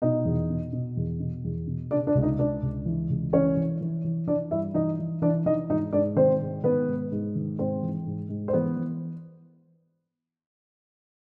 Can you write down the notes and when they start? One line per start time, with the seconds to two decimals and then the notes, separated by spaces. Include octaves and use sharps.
0.02 B2 D#4 D#5
0.25 E2
0.50 B2
0.73 B2
0.97 E2
1.20 B2
1.44 E2
1.67 B2
1.91 C#3 D4 D5
2.07 D4 D5
2.15 C#2
2.22 D#4 D#5
2.39 C#2 D4 D5
2.63 C#2
2.86 E3
3.10 C#2
3.33 E3 C#4 C#5
3.57 E3
3.81 E3
4.04 E3
4.27 E3 D4 D5
4.51 G2 E4 E5
4.74 E3 D#4 D#5
4.99 E3
5.22 E3 D4 D5
5.46 E3 D#4 D#5
5.70 G#2 D#4 D#5
5.93 G#2 D4 D5
6.16 D#3 C4 C5
6.41 G#2
6.64 D#3 B3 B4
6.87 G#2
7.12 G#2
7.35 D#3
7.59 G#2 C4 C5
7.82 E3
8.06 G#2
8.29 G#2
8.48 C5
8.53 E3 B3 B4
8.76 E3